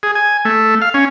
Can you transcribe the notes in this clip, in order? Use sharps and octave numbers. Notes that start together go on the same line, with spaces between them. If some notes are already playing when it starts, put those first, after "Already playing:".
G#4
G#5
A3
F5
C#4